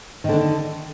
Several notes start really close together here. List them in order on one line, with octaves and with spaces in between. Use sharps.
D#3 D3 D4